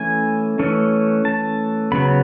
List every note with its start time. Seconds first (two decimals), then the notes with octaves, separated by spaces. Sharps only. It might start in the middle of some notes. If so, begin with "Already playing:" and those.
Already playing: E3 A3 C#4 G#5
0.59 E3 A3 C#4
1.25 A5
1.92 C#3 F#3 B3 B5